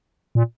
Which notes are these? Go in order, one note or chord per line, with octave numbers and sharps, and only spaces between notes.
A#2